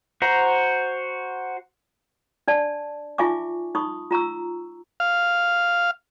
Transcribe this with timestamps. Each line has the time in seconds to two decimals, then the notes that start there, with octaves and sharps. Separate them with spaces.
0.22 F#4 C5 A#5
2.47 D4 D5 A5
3.18 D#4 F4 E5 G#5 C#6 D6
3.75 D#4 B5 C#6 D#6
4.11 F4 A#5 C#6 E6
5.00 F5